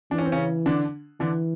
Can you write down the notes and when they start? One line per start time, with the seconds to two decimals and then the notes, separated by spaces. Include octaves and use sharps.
0.11 E3 D4
0.18 C#4
0.25 C4
0.32 C#3 C#4
0.66 D3 D4
1.20 D3 E3 D4